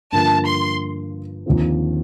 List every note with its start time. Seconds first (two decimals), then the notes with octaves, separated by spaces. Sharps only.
0.12 G2 D3 F3 A#3 A5
0.46 C6
1.46 D#2 D3 F3 C4